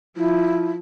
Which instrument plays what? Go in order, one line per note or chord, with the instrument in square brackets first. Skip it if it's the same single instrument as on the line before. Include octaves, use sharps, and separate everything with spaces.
[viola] F3 [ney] E4